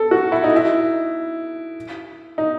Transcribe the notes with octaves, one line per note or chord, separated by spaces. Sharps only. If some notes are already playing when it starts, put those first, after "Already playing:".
Already playing: A4
F#4
E4
D#4
E4
D#4